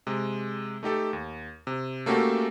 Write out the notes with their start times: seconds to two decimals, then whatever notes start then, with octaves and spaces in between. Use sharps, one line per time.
0.07 C3 G#3
0.83 A3 D#4 G4 A4
1.13 D#2
1.67 C3
2.06 A3 A#3 C#4 F#4 G4 A4